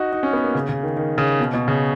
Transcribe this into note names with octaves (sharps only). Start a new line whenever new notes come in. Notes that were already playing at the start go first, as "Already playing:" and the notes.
Already playing: D#4 F#4
D#4
C#4
B3
A#3
C#3
C#3
D#3
D#3
C#3
B2
B2
C#3